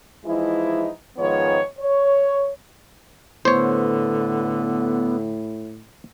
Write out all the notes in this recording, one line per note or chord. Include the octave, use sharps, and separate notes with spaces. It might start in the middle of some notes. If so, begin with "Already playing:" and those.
E3 F3 G#3 D#4 E4
G#2 D#3 F3 G#3 B3 C#5
C#5
A2 D3 B3 C5 C#5